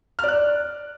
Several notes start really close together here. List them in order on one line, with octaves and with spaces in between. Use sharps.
F6 D5 F#6